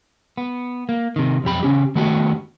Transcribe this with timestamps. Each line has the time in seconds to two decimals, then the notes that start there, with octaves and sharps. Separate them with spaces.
0.37 B3
0.89 A#3
1.16 C3 D#3
1.44 B1 F2 G4 B5
1.63 C#3 C#4 G4
1.95 D#3 A3 B3 F#4 G4